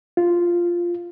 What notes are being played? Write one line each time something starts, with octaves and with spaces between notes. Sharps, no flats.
F4